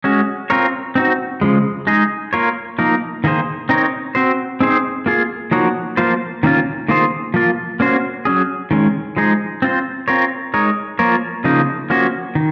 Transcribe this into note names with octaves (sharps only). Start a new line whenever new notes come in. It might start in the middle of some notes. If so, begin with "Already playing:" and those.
G#3 C#4 F#4
C4 F4 A#4 C#5
C4 D#4 F#4
C#3 F3 G#3
G#3 D#4 G#4
A#3 F4 A#4 C#5
F3 A#3 D#4 A#4
D#3 A#3 D#4 G#4 C5
C4 D#4 A#4 C#5
C4 F#4 C5
C4 D#4 G#4 C5
A#3 F4 G#4
F3 A#3 D#4 F#4 C#5
F3 A#3 F4 C5
D#3 A#3 C#4 F4
D#3 A#3 F4 G#4 C5
F3 A#3 F4
A#3 C#4 F#4 C5
F#3 C#4 G#4
D#3 G#3 C#4
F3 G#3 D#4 G#4
C4 F4 C5
C4 F4 A#4 C#5
G#3 D#4 A#4 C#5
F3 A#3 F4 A#4 C#5
C#3 F3 A#3 D#4
F3 A#3 C#4 F#4
D#3